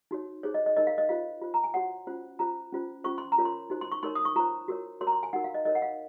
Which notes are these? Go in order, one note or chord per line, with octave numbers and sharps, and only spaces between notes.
D#4 F#4 C#5
D#4 G#4 C5 C#5
D#5
D#5
D#4 A#4 C#5 D#5
F5
D#5
F4 C5 F5
F4 C5
A#5
G#5
F#4 C#5 F#5
C#4 F4 C5
F4 C5 A#5
C#4 F4 C5
C#4 F4 C5 C#6
C6
A#5
F4 A#4 C#5
C6
D#4 F#4 C5
C6
C#6
D#4 A#4 C#5 C6
D#6
C#6
F4 C5 A#5
F#4 A#4 C#5
F#4 A#4 C#5 C6
A#5
C6
G#5
D#4 F#4 A#4 F#5
F5
D#5
D#4 A#4 C#5 D#5
F#5
F5